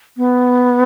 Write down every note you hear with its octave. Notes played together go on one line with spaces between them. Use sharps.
B3